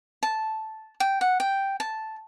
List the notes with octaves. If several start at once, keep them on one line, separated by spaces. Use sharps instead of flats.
A5
G5
F#5
G5
A5